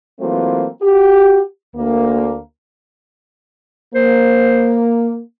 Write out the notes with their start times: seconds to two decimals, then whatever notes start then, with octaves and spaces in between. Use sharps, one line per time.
0.20 E3 F#3 A3 A#3 C4 F4
0.81 F#4 G4
1.75 D2 A#3
3.95 A#3 C5